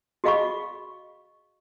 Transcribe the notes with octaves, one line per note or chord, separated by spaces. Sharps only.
F#4 G#4 D#5 F5 B5 C#6